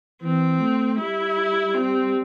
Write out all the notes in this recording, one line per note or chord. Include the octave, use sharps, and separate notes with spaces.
E3 C4
A3
G3 E4
C4